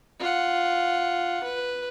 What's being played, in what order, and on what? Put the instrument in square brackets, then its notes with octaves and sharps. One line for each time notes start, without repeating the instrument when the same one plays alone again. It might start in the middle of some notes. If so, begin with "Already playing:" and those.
[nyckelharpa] F4 F#5
B4